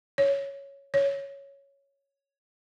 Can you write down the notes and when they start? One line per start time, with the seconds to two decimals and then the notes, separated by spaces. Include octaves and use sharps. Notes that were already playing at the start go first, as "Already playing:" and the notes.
0.18 C#5
0.94 C#5